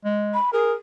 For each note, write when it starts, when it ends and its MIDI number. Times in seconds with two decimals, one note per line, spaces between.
0.05 0.36 56
0.34 0.50 83
0.53 0.72 68
0.53 0.73 70